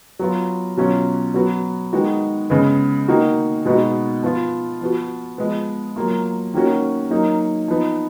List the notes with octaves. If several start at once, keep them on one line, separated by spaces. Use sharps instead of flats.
F#3 B3 F4
B2 F#3 C#4 F4
F#3 B3 F#4
D#3 G#3 B3 D#4 F#4
C#3 G#3 B3
D#3 A#3 D#4 F#4
B2 G#3 B3 D#4 F#4
F3 B3 F4
F3 B3 F#4
F3 G#3 B3
F#3 A#3 F4
D#3 A#3 C#4 F#4
F#3 A#3 D#4
F3 B3 D#4